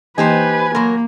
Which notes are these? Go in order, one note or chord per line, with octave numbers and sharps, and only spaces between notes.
E3 A#3 D#4 G4 B4 C5 G#5 A5
F#3 A#3 A#4 B5 C6